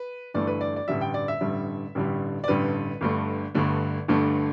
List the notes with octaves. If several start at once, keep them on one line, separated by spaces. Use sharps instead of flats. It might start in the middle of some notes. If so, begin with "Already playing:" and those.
Already playing: B4
G1 G2 E3 A3 D5
B4
D5
D5
A1 G2 D3 G3 E5
G5
D5
E5
A1 G2 D3 G3
A1 G2 D3 G3
D5
A1 G2 D3 G3 B4
G1 G2 D3 A3
G1 G2 D3 A3
G1 G2 D3 A3